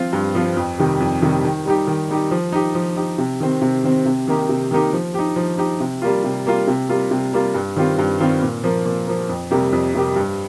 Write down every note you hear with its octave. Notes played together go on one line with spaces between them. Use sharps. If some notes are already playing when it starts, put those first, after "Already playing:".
Already playing: F3 C4 F4
G2
F3 C4 F4
F2
C3 D#3 G3
F2
C3 D#3 G3
D#3
G3 D#4 G4
D#3
G3 D#4 G4
F3
D#4 G4
F3
D#4 G4
C3
D#3 C4
C3
D#3 C4
C3
D#3 A#3 D#4 G4
C3
D#3 A#3 D#4 G4
F3
D#4 G4
F3
D#4 G4
C3
G3 A#3 F4
C3
G3 A#3 F4
C3
G3 A#3 F4
C3
G3 A#3 F4
G2
D#3 G3 C4 F4
G2
D#3 G3 C4 F4
A#2
F3 A#3
A#2
F3 A#3
F2
C3 G3 A#3 G4
F2
C3 G3 A#3 G4
G2